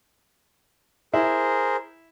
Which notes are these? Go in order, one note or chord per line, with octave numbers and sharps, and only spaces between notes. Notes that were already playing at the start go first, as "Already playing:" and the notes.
E4 G#4 A#4 C5